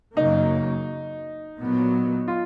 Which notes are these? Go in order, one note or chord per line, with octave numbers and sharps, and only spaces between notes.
F#2 C#3 F#3 A#3 D#4
A#2 F#3 B3
F4